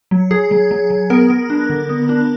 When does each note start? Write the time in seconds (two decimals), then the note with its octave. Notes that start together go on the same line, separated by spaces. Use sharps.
0.11 F#3
0.31 F#3 G#4
0.51 F#3
0.71 F#3
0.90 F#3
1.10 B3 A#4
1.30 B3
1.50 D4
1.70 D3
1.89 B3
2.09 D4